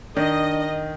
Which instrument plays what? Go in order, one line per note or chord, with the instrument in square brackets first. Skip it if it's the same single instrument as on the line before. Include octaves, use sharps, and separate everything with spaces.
[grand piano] D#3 [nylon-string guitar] D4 [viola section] D#5